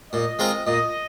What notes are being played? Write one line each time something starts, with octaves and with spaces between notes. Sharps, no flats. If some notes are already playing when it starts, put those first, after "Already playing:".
A#2 D#5
G#3 C4 F4 A#4
A#2 D#5